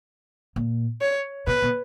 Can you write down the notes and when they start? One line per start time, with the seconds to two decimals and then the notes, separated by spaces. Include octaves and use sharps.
0.56 A#2
1.01 C#5
1.47 B2 B4
1.62 B2